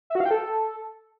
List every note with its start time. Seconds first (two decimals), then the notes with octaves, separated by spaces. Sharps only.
0.10 E5
0.15 F#4
0.20 F5
0.25 G5
0.31 A4